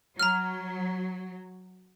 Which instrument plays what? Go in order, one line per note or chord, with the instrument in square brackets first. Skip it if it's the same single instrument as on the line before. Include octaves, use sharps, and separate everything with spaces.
[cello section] F#3 [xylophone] A#5 F6